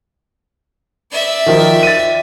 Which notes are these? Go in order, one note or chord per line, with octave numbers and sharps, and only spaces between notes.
D5 E5
D#3 F3
A6 D#7